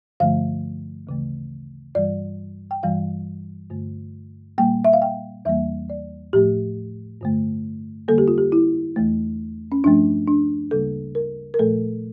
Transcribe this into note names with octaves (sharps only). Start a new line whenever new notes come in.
G2 D3 F3 A3 F5
D2 C#3 E3 A3
G2 E3 G3 D5
G5
G2 E3 G3 F5
G2 D3 A3
A#2 G3 A#3 G5
E5
F5
G5
E2 E3 G3 A#3 E5
D5
A2 F3 A3 G4
G2 D3 A3
F2 D3 G3 A#3 A4
G4
F4
G4
E4
E2 E3 A3
C#4
G2 F3 A3 D4
D4
D2 C#3 G3 A#3 A4
A#4
A#4
A#2 F3 A3 A4